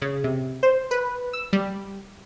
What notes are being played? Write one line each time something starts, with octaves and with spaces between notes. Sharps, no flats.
C#3
C3
C5
B4
E6
G3